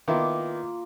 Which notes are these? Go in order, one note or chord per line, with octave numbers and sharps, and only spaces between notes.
D#3 A#3 B3 E4 F4 D6